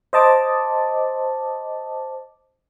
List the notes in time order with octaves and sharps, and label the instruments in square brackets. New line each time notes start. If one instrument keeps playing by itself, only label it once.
[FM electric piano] C5 D#5 A5 D6